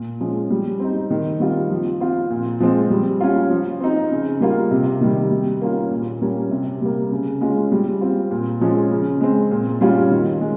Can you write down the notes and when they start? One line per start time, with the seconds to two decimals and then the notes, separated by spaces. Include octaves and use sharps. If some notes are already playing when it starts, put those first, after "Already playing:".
Already playing: A#2
0.20 F3 G#3 C#4
0.50 G3
0.80 C4 D#4
1.10 D#3
1.40 G3 C4 F4
1.70 F3
2.00 C4 F4
2.30 A#2
2.60 F3 G#3 C4
2.90 G3
3.21 C#4 F4
3.50 F3
3.81 C4 D#4
4.11 C#3
4.41 G3 A#3 F4
4.71 C3
5.01 D#3 G3
5.31 G3
5.61 A#3 C#4 F4
5.90 A#2
6.21 G3 A#3 C#4
6.51 C3
6.81 G3 A#3
7.12 C#3
7.41 G#3 C#4 F4
7.72 G3
8.01 C4 F4
8.31 A#2
8.61 F3 G#3 C#4
8.91 C#3
9.21 G#3 C4
9.51 A#2
9.81 G3 C#4 F4
10.11 D#3
10.41 G#3